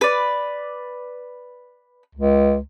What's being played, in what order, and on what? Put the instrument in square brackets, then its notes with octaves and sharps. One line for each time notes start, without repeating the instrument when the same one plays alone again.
[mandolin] B4 D5
[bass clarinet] C#2